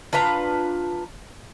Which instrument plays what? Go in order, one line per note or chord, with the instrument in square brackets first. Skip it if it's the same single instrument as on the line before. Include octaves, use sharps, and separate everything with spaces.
[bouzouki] D4 F4 B4 A#5